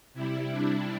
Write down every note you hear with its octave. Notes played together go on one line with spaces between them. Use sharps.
C3 G3 E4
D4